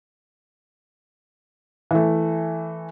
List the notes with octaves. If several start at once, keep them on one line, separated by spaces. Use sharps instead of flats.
E3 A3